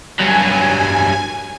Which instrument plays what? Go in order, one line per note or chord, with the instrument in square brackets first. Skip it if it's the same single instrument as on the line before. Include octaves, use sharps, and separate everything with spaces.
[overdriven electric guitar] G2 F#3 [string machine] G#5